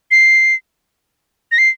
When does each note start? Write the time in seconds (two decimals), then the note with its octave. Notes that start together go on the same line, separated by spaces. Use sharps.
0.11 C7
1.52 A#6
1.58 C7